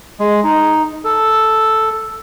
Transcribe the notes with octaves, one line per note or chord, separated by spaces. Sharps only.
G#3
D#4
A4